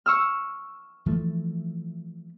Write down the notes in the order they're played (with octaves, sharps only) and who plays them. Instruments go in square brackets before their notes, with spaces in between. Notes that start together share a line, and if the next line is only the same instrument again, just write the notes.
[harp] C#6 E6 F6
[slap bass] E3 F3 A3